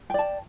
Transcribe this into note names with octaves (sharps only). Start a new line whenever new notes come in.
D5 G5 A5